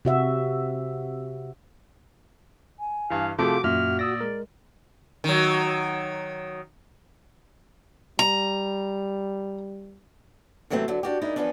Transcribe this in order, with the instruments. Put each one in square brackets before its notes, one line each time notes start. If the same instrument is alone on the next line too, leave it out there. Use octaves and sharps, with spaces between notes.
[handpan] C3 F#4 E5
[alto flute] G#5
[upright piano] G2 E3 [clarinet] F5
[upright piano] C3 F3 A3 [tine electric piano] F4 G#4 [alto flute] F#4 [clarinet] D6
[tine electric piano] F#2 E5 [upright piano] A#2 [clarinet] F6
[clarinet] D5 [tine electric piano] D#6 E6 A#6
[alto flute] G#3 [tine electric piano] A#4
[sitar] D#3 F#3
[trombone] G3 [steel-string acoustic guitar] A#5
[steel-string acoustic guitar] C3 E3 F#3 A3 C4
D3 F#3
D4 F#4 G4
G#3 D#4 E4 A#4 D5
E3 F3 B3 C#4 D4